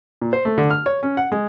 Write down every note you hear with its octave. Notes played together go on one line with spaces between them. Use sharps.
A#2
C5
A3
D3
F6
C#5
C#4
F#5
G#3